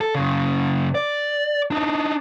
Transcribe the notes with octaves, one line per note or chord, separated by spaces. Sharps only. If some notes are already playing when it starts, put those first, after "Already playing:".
A4
F#2 C#3
D5
D4 D#4